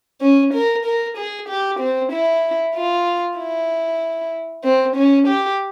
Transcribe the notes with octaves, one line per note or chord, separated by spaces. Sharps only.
C#4
A#4
A#4
G#4
G4
C4
E4
F4
E4
C4
C#4
G4